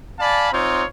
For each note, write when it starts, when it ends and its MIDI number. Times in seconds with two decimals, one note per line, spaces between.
0.20 0.50 74
0.20 0.50 77
0.20 0.50 80
0.20 0.50 81
0.20 0.50 83
0.52 0.85 60
0.52 0.85 63
0.52 0.85 65
0.52 0.85 72
0.52 0.85 73